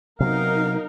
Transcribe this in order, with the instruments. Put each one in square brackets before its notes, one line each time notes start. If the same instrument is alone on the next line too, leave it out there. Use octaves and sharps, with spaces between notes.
[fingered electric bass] C3 F#3 B3 [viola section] D#4 A#4 [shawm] F5